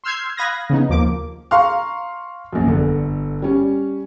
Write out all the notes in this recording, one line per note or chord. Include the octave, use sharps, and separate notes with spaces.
C6 E6 F6 G6 G#6 C7
F5 B5 D#6 F#6 G#6 A#6
C#3 B3 D#4
D#2 F3 A#3 D6
F5 A#5 C6 C#6 F6
A#1 F#2
G1 D3 A4
G3 C#4